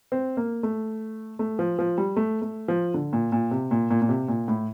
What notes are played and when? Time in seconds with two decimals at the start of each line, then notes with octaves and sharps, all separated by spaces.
0.12 C4
0.37 A#3
0.63 A3
1.39 A3
1.59 F3
1.79 F3
1.98 G3
2.16 A3
2.42 A3
2.68 F3
2.94 D3
3.13 A#2
3.32 A#2
3.51 C3
3.71 A#2
3.90 A#2
4.02 A#2
4.09 C3
4.28 A#2
4.48 A2